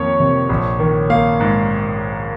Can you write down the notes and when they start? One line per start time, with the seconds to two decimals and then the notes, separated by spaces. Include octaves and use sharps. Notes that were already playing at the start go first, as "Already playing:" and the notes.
Already playing: F2 D#3 A#3 C#5
0.20 C3
0.49 A#1
0.79 D#3
1.10 A#3 F5
1.40 G#2